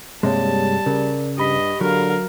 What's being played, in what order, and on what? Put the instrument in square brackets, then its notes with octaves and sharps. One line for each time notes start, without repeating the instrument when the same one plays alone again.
[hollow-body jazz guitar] G2 C3 G#3 [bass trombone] G3 [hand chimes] A#3 C#5 [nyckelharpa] A5
[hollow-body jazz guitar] C#3 [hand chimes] A#4 D5
[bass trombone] G2 [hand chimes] G4 B5 B6 [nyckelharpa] D#5
[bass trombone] D3 [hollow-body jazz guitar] F#3 [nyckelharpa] A#4 F5